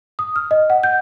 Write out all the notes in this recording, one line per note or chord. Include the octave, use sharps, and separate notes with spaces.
D#6
F6
D#5
F#5
G6